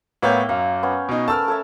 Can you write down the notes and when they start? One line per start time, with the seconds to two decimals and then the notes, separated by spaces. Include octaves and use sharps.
0.22 A2 A#3 B3 C#5 E5 G5
0.49 F#2 F5
0.83 B3 C#4
1.09 B2 D#4
1.28 A3 A#4 A5 E6 F6
1.48 A4 C#5 E5